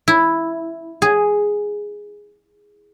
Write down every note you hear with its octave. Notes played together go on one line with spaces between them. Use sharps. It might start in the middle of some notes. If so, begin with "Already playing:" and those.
E4
G#4